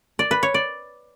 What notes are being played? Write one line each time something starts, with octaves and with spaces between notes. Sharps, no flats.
D5
B4
C#5
D5